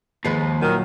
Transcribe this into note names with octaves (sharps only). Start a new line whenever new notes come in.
D#2 F3 G#3 B4 C7
A#2 D#3 F#3